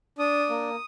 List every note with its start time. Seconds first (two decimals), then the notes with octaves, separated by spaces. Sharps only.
0.18 D4 D#6
0.49 A#3